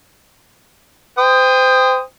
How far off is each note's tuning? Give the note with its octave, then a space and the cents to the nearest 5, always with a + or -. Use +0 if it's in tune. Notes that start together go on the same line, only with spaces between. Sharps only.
C5 -30 G5 +20 D#6 +0